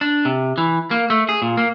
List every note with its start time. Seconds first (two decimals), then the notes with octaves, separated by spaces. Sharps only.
0.01 D4
0.25 C3
0.58 E3
0.91 A#3
1.10 A3
1.29 G#4
1.42 A#2
1.57 A#3